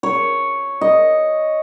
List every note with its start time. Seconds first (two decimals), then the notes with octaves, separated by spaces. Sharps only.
0.03 C#5
0.81 D#5